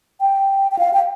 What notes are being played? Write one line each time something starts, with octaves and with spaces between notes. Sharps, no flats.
G5
G5
F5
G5